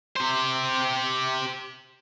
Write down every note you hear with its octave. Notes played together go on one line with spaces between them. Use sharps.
G4 C5